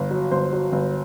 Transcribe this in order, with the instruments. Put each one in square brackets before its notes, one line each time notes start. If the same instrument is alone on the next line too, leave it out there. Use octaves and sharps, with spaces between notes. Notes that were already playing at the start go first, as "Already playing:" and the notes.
Already playing: [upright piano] G1
F#3
G1 C5
F#3
G1